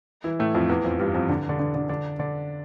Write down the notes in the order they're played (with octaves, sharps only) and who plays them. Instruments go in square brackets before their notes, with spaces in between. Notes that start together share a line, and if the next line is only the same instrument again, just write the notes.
[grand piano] E3 E4
A2 A3
F2 F3
E2 E3
F2 F3
G2 G3
F2 F3
D3 D4
D3 D4
D3 D4
D3 D4
D3 D4
D3 D4